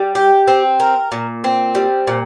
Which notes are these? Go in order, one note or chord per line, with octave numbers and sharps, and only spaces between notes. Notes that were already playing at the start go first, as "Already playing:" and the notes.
Already playing: G3
G4
C4
A#4
A#2
C4
G3
A#2